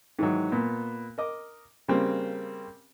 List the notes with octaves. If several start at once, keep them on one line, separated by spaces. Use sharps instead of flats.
G#2 D#3 E3 F#3
A#2 B3
A#4 D#5 D6
C#3 G3 A#3 C4 G4